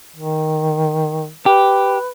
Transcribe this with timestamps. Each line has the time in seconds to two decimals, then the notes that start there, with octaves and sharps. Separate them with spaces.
0.16 D#3
1.46 G4 B4